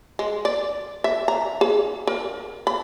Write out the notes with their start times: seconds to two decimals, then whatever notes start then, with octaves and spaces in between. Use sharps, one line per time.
0.19 G#3
0.45 D5
1.04 E5
1.28 A#5
1.61 G#4
2.07 A#4
2.67 B5